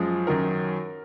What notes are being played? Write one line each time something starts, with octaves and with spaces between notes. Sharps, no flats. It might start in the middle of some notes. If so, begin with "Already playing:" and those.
Already playing: F#2 F3 G#3
F#2 D#3 F#3 A#4